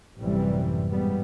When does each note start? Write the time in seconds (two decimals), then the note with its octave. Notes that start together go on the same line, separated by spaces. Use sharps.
0.19 A1 F#2 C3 E3 G3
0.90 G#2 G3 B3